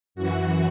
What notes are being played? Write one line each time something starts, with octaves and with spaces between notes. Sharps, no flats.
F#2 E3 F#4